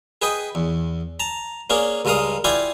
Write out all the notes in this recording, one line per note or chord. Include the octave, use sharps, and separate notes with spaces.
G#4 B4 D#5 G5
E2
A5 A#5
A#3 C#4 D4 G#4 A#4
C#2 G2 G#3 A#4 F5 D#6
E4 F4 D5 F5 G5 G#5